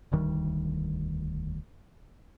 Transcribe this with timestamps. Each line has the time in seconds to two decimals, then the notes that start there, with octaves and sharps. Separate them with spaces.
0.12 E1 D2 D#3 G3